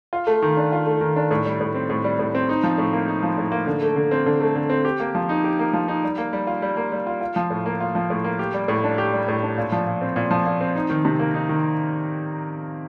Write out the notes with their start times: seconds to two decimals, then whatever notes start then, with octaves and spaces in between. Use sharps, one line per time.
0.13 F4
0.27 A3
0.42 D#3
0.57 D4
0.72 F4
0.86 A3
1.01 D#3
1.16 D4
1.31 A2
1.45 G3
1.61 A2
1.74 C4
1.89 A2
2.04 G3
2.19 A2
2.35 C4
2.49 D#4
2.64 F3
2.78 A2
2.93 A#3
3.08 D#4
3.23 F3
3.38 A2
3.52 A#3
3.67 D3
3.82 A3
3.96 D3
4.11 C4
4.26 D3
4.41 A3
4.55 D3
4.70 C4
4.85 G4
5.00 A#3
5.15 F3
5.29 D#4
5.44 G4
5.59 A#3
5.73 F3
5.88 D#4
6.04 G3
6.18 A#3
6.33 G3
6.47 F4
6.62 G3
6.77 A#3
6.92 G3
7.07 F4
7.21 F4
7.36 F3
7.50 A2
7.66 A#3
7.80 F4
7.95 F3
8.10 A2
8.24 A#3
8.39 G4
8.54 G3
8.68 A2
8.84 D4
8.98 G4
9.13 G3
9.28 A2
9.43 D4
9.58 A#2
9.72 F3
9.87 A#2
10.01 C4
10.16 A#2
10.31 F3
10.46 A#2
10.61 C4
10.75 D#4
10.90 D#3
11.05 C3
11.19 A#3
11.34 D#4
11.49 D#3